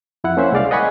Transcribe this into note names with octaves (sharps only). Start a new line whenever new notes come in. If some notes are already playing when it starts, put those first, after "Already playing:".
F2 E4 F#5
A#3 C#4 C5 E5 F#5
C2 G#3 D5 F5
D#5 F#5 G#5 B5 C#6 D#6